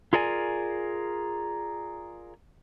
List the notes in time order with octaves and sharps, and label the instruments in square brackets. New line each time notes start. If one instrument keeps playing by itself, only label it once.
[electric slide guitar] F4 G#4 A#4 D5 G#5